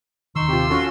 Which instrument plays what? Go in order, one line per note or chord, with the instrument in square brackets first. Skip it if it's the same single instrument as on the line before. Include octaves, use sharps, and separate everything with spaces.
[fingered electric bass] D#1 D#3 [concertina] D#4 C#6 [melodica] C6 E6
[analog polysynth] C3 F4 [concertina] G4
[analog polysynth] C#4 F4 A4 [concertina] F#4